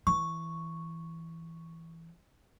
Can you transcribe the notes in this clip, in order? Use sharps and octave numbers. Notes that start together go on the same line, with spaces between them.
E3 C#6